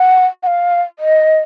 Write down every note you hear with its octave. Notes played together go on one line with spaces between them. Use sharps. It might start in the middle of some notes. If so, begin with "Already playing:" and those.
Already playing: F#5
F#5
F5
D#5